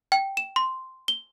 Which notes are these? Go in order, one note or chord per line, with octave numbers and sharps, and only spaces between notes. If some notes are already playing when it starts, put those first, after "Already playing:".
G5
E7
C6
G7